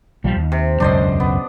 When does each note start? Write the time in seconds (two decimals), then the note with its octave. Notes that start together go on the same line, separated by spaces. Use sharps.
0.24 B1 F3 G3
0.36 D#2
0.52 C3
0.80 E1 C#2 F#2 D4 C5 D#5
1.20 B3